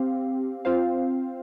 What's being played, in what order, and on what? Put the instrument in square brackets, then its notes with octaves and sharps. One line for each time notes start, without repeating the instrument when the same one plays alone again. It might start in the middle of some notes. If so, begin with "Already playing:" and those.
Already playing: [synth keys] C4 G4 F5
C4 F4 C5 F5